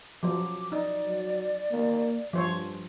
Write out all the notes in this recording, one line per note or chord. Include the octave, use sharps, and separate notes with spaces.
F3 F#3 D6
D#4 D5
F#3
A#3
G2 F3 C5 C#5